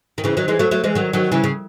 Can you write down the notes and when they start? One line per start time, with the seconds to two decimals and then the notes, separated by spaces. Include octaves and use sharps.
0.18 D#3
0.24 C#3 E3
0.37 D#3 F#3
0.48 E3 G#3
0.59 F#3 A3
0.71 F#3 A3
0.84 E3 G#3
0.95 D#3 F#3
1.13 D#3 F#3
1.32 C#3 E3
1.44 C#3